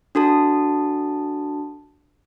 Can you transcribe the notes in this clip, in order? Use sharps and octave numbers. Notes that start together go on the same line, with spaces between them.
D4 F#4 A4 A5